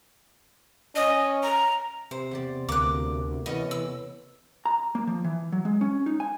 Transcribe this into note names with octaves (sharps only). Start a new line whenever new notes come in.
C#4 D#5
A#5
C3 C5
E2 G4 D5
D2 A#3 C4 D6 F#6
E3 A3 B3 C#4 D#5
E6
A#5
A#3
F3
E3
F#3
G#3
C#4
D#4
G#5